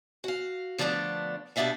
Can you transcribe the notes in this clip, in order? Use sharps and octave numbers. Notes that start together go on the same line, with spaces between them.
F#4 F5
D3 F3 A3 B3 C#4 D4
B2 G3 B3 D4 E5 F5